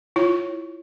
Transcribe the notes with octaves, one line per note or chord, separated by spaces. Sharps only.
E4 F4 C#5